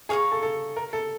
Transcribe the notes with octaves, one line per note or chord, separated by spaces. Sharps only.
G#4 C#5 F5 A#5 C#6
A4
A4
A#4
A4